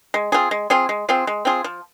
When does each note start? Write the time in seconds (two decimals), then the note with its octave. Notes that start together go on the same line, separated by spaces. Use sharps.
0.14 G#3
0.32 C4 F4 G#4
0.51 G#3
0.70 C4 F4 G#4
0.89 G#3
1.09 C4 F4 G#4
1.27 G#3
1.45 C4 F4 G#4
1.64 F3